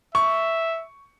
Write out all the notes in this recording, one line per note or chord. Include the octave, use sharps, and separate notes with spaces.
E5 C#6